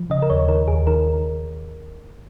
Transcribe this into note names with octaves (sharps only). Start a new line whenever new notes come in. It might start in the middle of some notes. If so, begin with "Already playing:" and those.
Already playing: F3
C#3 D#5
A#4
D#2 C#5
D#3 A#4
D#2 G#4
D#3 A#4